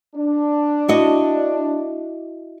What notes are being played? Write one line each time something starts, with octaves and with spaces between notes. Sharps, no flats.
D4
E4 F#4 D#5